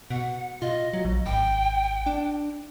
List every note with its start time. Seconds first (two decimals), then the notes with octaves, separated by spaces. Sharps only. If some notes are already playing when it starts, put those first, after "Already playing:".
0.10 B2 F#5
0.62 F4 D#5
0.93 F#3
1.05 A#1
1.26 G#1 G5
2.06 D4